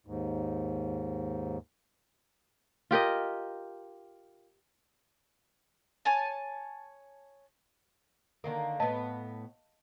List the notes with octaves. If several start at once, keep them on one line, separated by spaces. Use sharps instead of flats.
D#2 G#2
F4 G4 A#4 D#5
C#5 G#5 A5
D3 D#3 A#3
A2 B3 D#5 F5 A5